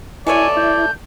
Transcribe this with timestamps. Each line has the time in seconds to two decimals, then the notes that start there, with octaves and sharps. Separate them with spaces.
0.27 B2 A3 E4 C#5 D5 G#5
0.57 E4 G6